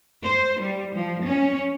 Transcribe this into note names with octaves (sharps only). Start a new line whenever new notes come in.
C5
G3
F3
C#4